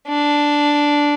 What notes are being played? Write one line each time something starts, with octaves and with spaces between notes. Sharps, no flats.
D4